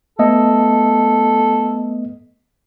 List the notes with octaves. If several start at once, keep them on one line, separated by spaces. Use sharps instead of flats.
A3 B3 A4 D#5